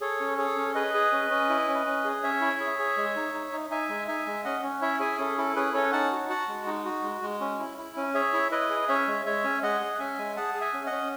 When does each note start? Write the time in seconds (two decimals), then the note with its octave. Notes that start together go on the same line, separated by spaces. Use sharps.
0.01 G#4 A4 C#5
0.20 C#4
0.38 G#4 A4 C#5
0.56 C#4
0.75 G#4 B4 D#5
0.94 G#4
1.12 C#4
1.30 C#4
1.49 E4
1.68 C#4
1.87 C#4
2.04 G#4
2.23 C#4 C#5 E5
2.41 E4
2.60 G#4
2.79 G#4
2.97 G#3
3.16 D#4
3.34 D#4
3.52 D#4
3.70 D#4 E5 G#5
3.89 G#3
4.08 D#4 E5 G#5
4.27 G#3
4.44 C#4 D#5 F#5
4.63 C#4
4.82 E4 C#5 E5
5.00 G#4 E5 G#5
5.19 C#4 A4
5.38 E4 A4
5.56 C#4 G#4 B4
5.74 C#4 A4 C#5
5.92 D#4 F#5 A5
6.12 F#4
6.29 F#4 F#5 A5
6.48 G#3
6.67 D#4
6.85 F#4
7.03 G#3
7.22 G#3
7.41 C#4
7.59 E4
7.78 E4
7.96 C#4
8.14 G#4 C#5 E5
8.33 E4
8.51 E4 B4 D#5
8.70 G#4
8.88 C#4 C#5 E5
9.07 G#3
9.25 G#3 C#5 E5
9.44 C#4
9.63 G#3 D#5 F#5
9.80 G#4
9.95 F#5
9.99 C#4 E5 G#5
10.18 G#3
10.36 G#4 F#5 A5
10.54 G#4
10.61 E5 G#5
10.73 C#4
10.86 D#5 F#5
10.92 C#4